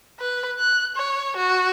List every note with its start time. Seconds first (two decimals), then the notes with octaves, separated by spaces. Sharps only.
0.19 B4
0.59 F#6
0.96 C#5
1.37 F#4